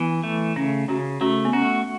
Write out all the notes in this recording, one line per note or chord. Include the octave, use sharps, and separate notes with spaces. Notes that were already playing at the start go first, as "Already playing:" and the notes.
Already playing: E3 B3
A3
C#3 C#4
C#3 C#4 F#4
A3 C#4 F#4
B3
C#4 F#4